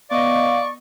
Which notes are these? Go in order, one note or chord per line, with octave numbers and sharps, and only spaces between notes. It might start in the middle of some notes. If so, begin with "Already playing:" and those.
B3 D5 D#5 F5 C#6